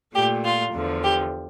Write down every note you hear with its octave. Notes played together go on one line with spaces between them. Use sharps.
A#2 A3 G4
F4
E2 D3 F3
G4